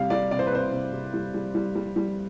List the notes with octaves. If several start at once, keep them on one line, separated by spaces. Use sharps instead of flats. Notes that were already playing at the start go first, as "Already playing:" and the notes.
Already playing: C3 G3 F5
G3 D5
C3 D5
C5
B4
C3 C5
C3
C3
G3
G3
G3
G3
G3